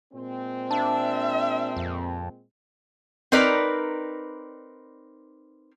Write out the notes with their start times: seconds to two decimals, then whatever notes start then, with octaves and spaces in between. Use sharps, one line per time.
0.13 A#2 G#3 C4
0.71 D4 E5 A5
1.77 F2
3.32 C4 D#4 A#4 B4 D5